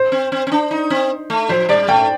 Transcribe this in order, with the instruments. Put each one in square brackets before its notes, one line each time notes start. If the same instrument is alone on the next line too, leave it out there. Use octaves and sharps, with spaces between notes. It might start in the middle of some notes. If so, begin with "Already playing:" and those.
Already playing: [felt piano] C5
[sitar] C4
C4
C4
D4
D#4
C4
A3
[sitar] F3 [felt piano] C5
[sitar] G3 [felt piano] D5
[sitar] A3 [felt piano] G5